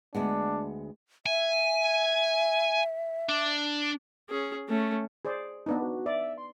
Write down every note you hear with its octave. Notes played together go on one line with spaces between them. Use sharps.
D2 G#3 B3 D4
E5 G#5
D4
C#4 G#4
A3 C#4
G#4 C5 D5
B3 D4 D#4 B4
F#4
D5 E5
C6